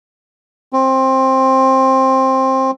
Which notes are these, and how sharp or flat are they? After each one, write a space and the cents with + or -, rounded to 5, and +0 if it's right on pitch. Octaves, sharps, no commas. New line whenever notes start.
C4 +15